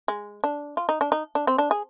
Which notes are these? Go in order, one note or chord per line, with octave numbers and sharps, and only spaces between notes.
G#3
D4
F4
D#4
D4
D#4
D4
C4
D4
G#4